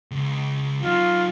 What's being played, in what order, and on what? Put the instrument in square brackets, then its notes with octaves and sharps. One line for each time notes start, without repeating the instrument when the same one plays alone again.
[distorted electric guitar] C#2
[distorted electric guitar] F#3 D#4 [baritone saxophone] F4